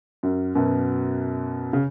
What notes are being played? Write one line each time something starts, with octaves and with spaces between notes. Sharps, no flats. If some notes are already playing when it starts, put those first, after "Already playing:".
F#2
F#2 B2
C#3